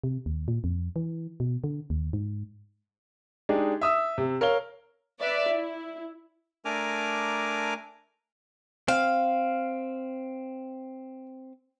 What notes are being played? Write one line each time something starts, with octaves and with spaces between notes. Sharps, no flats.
C3
D#2
A#2
F2
E3
B2
D3
D#2
G#2
G#3 D4 D#4 G4
E5 D#6 E6
C3
A#4 C#5 F5 G7
B4 D5 E5
E4
A3 D4 A#4 G#5 A#5 D6
C4 F5